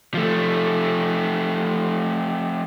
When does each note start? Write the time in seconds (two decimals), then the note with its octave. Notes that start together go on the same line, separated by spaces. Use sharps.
0.14 F3 A3